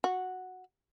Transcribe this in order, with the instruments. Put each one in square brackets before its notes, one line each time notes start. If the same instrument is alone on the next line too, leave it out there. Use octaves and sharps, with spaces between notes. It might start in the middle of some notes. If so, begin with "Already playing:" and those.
[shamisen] F#4